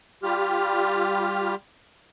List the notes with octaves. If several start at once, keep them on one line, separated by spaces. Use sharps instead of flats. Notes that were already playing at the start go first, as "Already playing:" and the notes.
G3 F4 G4 F6